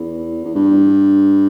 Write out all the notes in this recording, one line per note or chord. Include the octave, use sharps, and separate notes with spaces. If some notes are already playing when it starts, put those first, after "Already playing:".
Already playing: E2
E2
G2